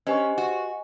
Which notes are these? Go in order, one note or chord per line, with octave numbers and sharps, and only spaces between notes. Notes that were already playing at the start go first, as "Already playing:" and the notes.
C#4 G4 B4 C5 D#5 G#5 C#6
F#4